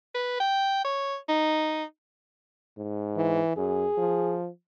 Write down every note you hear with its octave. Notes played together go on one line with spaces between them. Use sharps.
B4
G5
C#5
D#4
G#2
E3
F#2 G#4
F3